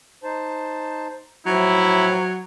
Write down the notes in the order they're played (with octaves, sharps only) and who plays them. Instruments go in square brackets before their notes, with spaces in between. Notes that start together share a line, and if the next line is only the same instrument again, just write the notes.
[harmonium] D#4 C5 A5
[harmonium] A2 F3 [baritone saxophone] F#3 [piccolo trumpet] E4